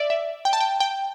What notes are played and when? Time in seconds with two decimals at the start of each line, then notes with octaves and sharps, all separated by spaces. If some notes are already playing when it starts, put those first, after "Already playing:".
Already playing: D5 E5
0.10 E5
0.45 G5
0.53 A5
0.60 G5
0.80 G5